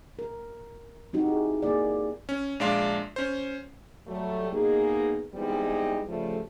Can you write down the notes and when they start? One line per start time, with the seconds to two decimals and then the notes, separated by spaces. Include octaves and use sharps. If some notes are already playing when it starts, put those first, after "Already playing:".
0.19 A#4
1.13 C4 D#4 F#4 G4
1.26 E4 G#4
1.62 A#3 G#4 D5
2.29 C#4
2.60 A#1 G#3 D4 D5 F5 C6
3.16 C#4 C5
4.07 F#3 G3 A3
4.51 B2 A#3 D#4 G#4
5.34 E3 G3 G#3 B3 C4 D#4
6.08 C#3 F3 G3 A3